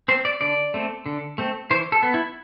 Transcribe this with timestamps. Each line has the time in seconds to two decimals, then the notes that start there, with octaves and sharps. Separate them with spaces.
0.08 C4 C5
0.25 D5
0.41 D3 D5
0.74 A3 C4
1.06 D3
1.38 A3 C4
1.71 E3 C5
1.92 A4
2.03 B3
2.14 E4